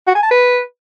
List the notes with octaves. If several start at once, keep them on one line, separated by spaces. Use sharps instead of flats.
F#4
G#5
A5
B4